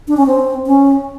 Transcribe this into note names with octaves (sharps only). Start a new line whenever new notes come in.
D4
C#4
C4
C#4